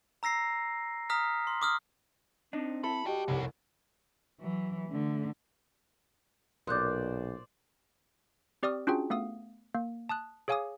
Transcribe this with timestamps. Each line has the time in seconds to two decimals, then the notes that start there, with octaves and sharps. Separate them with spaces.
0.23 A#5 E6 A#6 C7
1.10 A#5 D#6 F6 B6
1.47 C6
1.62 D6 D#6 F6
2.53 C4 D4 D#4
2.84 E4 A4 B5
3.06 F#4 G4 D5 D#5 G5
3.28 F1 C2 B3 C#5
4.41 E3 F#3
4.88 D3 A3
6.67 B1 A#2 C5 D5 D#6 F#6 G6
8.63 C4 G4 D5 C#6 D#6 F6
8.87 C#4 D4 F4 F#4 G#4 G5
9.10 A3 B3 F5 D#6
9.75 A#3
10.09 A5 D#6 F#6
10.48 G#4 C#5 F5 G#5 D6 D#6